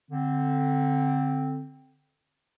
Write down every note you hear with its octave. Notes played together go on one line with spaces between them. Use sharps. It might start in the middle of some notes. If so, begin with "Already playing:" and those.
D3 C4